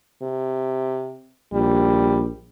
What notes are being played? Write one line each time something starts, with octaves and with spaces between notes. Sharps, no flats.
C3
A#1 G3